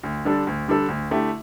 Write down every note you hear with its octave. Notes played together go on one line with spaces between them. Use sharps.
D2
D3 G3 D4 A4
D2
D3 G3 D4 A4
D2
D3 A3 E4 G4